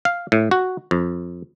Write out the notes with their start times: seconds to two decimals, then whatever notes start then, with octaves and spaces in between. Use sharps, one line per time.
0.05 F5
0.32 A2
0.51 F#4
0.91 F2